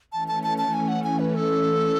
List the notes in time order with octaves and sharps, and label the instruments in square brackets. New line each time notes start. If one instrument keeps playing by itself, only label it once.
[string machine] E3 A3 C#4 [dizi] A5
[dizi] A5
A5
A5
G#5
F#5
G#5
B4
A4